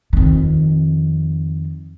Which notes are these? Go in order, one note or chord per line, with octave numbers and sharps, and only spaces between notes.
F2 D#3